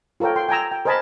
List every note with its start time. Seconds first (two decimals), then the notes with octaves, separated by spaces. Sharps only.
0.20 F4 A4 A#4 C#5 G5
0.36 G5 C6
0.49 G5 G#5 A#5 E6
0.72 G5
0.85 A#4 C5 D#5 G#5 A5 B5